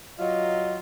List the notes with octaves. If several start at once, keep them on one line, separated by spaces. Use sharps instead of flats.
F#3 F4 D#5